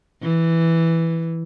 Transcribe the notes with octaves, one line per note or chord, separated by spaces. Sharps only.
E3